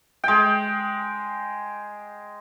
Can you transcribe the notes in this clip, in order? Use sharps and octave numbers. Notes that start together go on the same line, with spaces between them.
G#3 G5